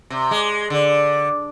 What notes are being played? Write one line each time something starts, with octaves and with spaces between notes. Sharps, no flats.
C3
G#3
D3